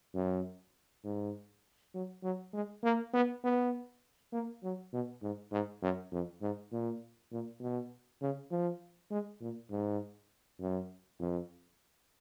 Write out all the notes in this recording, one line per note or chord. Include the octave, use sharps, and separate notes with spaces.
F#2
G#2
F#3
F#3
G#3
A#3
B3
B3
A#3
F#3
B2
G#2
G#2
F#2
F2
G#2
A#2
A#2
B2
C#3
F3
G#3
A#2
G#2
F#2
F2